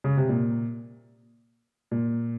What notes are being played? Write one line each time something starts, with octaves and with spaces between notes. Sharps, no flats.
C#3
C3
A#2
A#2